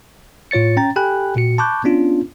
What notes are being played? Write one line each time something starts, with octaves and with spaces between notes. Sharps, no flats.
A2 F4 C#5 A6 C#7
C#4 G5 A#5 A6
G4 A4 G5 G#5 B5 F#6
A#2 F#4 C#7
A5 B5 C#6 D6 F#6 G6
B3 C#4 D4 F4